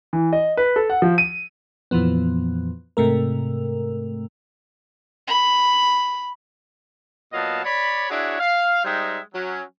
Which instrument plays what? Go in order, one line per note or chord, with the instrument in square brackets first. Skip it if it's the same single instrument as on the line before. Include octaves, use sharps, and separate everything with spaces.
[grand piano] E3
D#5
B4
A4
F#5
F3
D#7
[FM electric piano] F2 A#2 E3 F3 B3
G#2 C3 A3 A#4
[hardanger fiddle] B5
[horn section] A#2 F#3 B3 D#5 F5 A5
C#5 D5 B5
D4 E4 F#4 G#4 C#5 E5
F5
G3 G#3 D#4 C5 E5 G5
F#3 C#4